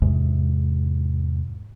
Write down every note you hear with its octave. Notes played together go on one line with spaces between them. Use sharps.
E2 G#2 C3 G#3